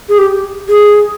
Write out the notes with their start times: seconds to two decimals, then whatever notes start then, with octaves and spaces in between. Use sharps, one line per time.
0.09 G#4
0.18 G4
0.69 G#4